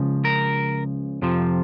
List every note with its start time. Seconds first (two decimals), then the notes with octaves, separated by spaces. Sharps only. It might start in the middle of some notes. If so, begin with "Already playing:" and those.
Already playing: C#2 C#3 F3
0.25 A#4
1.22 F2 C3 F3